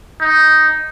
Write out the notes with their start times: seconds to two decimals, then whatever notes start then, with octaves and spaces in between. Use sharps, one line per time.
0.21 D#4